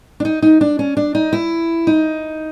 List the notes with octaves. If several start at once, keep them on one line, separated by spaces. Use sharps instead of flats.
D4
D#4
D#4
D4
C#4
D4
D#4
E4
D#4